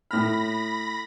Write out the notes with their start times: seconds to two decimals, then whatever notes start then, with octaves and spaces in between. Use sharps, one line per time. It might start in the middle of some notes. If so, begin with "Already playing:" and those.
0.11 A2 B5 F6 A#6